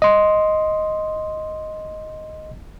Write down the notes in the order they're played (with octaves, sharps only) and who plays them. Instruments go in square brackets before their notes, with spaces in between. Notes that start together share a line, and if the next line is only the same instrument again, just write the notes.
[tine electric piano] D#5 C6